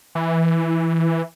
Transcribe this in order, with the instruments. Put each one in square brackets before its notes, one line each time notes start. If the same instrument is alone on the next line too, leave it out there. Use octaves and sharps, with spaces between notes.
[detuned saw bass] E3